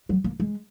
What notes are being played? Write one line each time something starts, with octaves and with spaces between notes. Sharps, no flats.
F#3
A#3
G#3